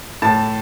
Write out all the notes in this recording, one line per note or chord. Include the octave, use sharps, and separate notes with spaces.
A2 A5